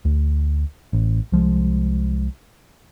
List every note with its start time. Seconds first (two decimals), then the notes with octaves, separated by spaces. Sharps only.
0.05 D2
0.93 A1
1.32 C2 F3 G#3